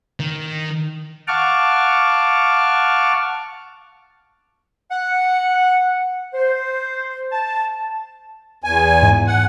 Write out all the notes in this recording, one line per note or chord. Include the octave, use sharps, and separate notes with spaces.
D#3
F5 F#5 A5 C#6 D6 F6
F#5
C5
A5
E2 G#5
G#2
F#5